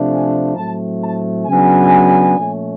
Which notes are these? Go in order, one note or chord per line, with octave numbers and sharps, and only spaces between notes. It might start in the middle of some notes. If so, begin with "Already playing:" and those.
Already playing: C3 F3 A3 D4
G#5
A2 F#3 A3 C4 A5
A5
C#3 F#3 B3 D4 G#5
A#2 F3 A3 C#4